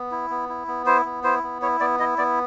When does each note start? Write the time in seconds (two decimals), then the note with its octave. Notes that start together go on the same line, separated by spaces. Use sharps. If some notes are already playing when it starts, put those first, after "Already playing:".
Already playing: B3
0.12 E4
0.30 B3
0.49 E4
0.68 B3
0.86 E4 C5
1.05 B3
1.24 E4 C5
1.43 B3
1.62 E4 C#5
1.80 B3 D5
1.99 E4 D#5
2.18 B3 D5